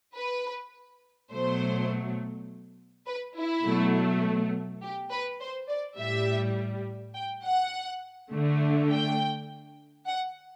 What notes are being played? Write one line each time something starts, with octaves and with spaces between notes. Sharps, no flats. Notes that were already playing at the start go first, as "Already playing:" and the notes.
B4
B2 F#3 A3 C5
B4
E4
B2 F#3 A3
G4
B4
C5
D5
A2 G3 E5
G5
F#5
D3 A3
G5
F#5